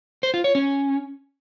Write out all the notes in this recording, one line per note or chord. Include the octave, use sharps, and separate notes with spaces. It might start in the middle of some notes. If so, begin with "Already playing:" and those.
C5
F4
C#5
C#4